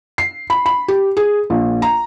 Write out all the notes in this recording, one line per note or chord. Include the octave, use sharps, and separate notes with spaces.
C7
B5
B5
G4
G#4
A#1
A#5